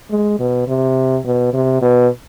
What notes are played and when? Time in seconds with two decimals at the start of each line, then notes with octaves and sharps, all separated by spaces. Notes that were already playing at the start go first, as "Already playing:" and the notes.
0.11 G#3
0.39 B2
0.68 C3
1.25 B2
1.53 C3
1.82 B2